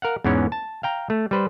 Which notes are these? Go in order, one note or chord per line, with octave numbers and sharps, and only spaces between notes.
A#4 F5 F#5
E2 G#2 E3 B3 C#4
A5
F5 G5 A#5
A3
G3 B4 C5